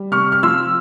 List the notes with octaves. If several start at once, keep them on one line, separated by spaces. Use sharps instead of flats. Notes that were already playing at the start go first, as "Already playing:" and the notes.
Already playing: G3
C3 C#6 F6
F6
F3 C6 E6